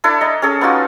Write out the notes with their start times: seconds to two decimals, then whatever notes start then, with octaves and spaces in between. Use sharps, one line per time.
0.04 D4 E4 A4 D5
0.21 D#5 A#5
0.42 C#4 G#4 A4
0.61 B3 D#4 F4 F#4